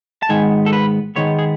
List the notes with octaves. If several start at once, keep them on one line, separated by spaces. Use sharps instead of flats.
A5
G#2 D#3 G#3 B3 G#5
A4
B4
G#2 D#3 G#3 B3 C#5
G#4